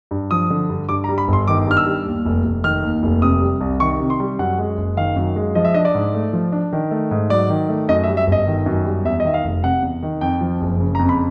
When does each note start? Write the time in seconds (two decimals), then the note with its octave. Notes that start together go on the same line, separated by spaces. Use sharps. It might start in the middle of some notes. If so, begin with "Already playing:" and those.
0.11 G2
0.31 F3 D#6
0.50 D3
0.70 G2
0.89 G2 D6
1.04 A#5
1.09 G3
1.18 B5
1.28 G1 C6
1.48 D#3 D6
1.67 G2 F6
1.77 E6
1.86 G3
2.06 D#2
2.25 F1
2.44 F1
2.64 D#3 F6
2.83 D#2
3.03 F1
3.22 C3 D#6
3.42 G3
3.61 C2
3.80 D#3 C#6
4.00 C3
4.10 C6
4.20 G3
4.39 F#2 F#5
4.58 G#3
4.78 F#1
4.97 D#3 F5
5.16 F#2
5.36 G#3
5.55 F3 D#5
5.65 E5
5.74 D4 D#5
5.85 D5
5.95 G#2
6.14 A3
6.33 F3
6.52 D4
6.73 D#3
6.91 A3
7.11 G#2
7.30 F#3 D5
7.50 D#3
7.69 A3
7.89 F#2 D#5
8.03 E5
8.08 G3
8.17 E5
8.27 G1
8.32 D#5
8.47 D#3
8.66 F#2
8.85 G3
9.05 E2 E5
9.20 D#5
9.25 D#3 E5
9.34 F5
9.44 F1
9.63 C3 F#5
9.83 E2
10.02 D#3
10.21 F2 G5
10.41 F3
10.61 F#1
10.80 C#3
10.95 A#5
10.99 F2
11.09 B5